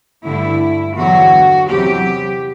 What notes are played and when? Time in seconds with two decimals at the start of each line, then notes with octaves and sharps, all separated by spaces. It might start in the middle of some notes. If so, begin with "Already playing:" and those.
0.24 G2 D3 A3 E4
0.96 E2 D3 F#3 F#4
1.69 E2 C3 F#3 G4